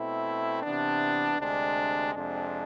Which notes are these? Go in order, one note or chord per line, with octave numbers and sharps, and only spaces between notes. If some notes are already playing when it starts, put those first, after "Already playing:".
Already playing: B2 A3 C4 E4
C3 E3 B3 D4
D2 C3 G#3 D4
F2 C3 G#3 D4